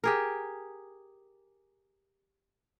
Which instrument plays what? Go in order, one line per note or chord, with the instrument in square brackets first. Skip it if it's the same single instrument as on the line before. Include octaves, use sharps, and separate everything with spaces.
[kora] G4 G#4 A#4